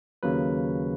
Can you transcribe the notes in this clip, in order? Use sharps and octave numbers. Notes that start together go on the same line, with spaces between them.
D#2 C#3 F#3 A#3 B4